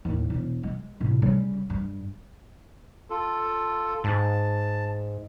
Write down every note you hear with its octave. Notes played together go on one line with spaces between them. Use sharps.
D#2 A2
E1
G#3
A2 C3
C#3 G3
G2
F4 A4
G#2 A5